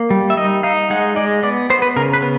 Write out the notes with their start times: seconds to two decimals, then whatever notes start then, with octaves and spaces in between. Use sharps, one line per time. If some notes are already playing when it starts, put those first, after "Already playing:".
Already playing: A#3
0.10 G3
0.30 E5
0.37 D#4 D#5
0.63 D#4 F5
0.90 G#3 F#5
1.16 G#3 D5
1.43 B3 D5
1.70 B3 C5
1.82 B4
1.96 C#3 A#4
2.14 B4
2.22 B3